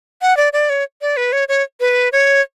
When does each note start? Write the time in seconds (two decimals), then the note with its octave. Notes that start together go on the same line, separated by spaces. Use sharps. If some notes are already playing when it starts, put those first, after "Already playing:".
0.22 F#5
0.37 D5
0.53 D5
0.70 C#5
1.02 D5
1.17 B4
1.32 C#5
1.48 C#5
1.80 B4
2.12 C#5